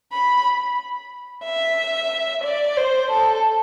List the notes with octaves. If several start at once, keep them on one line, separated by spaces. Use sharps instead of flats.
B5
E5
D5
C5
A4